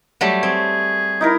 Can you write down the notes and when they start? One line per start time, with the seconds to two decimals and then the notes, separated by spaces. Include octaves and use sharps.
0.21 F#3 G3 A3
0.43 C4 G#4
1.21 D#4 E4 A#4